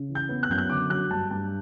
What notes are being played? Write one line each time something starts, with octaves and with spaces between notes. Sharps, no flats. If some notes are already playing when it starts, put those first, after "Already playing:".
Already playing: C#3
E3
G6
B3
F#6
F#2 G6
F#6
D3 D6
F#3 F#6
G2 A5
G2 A5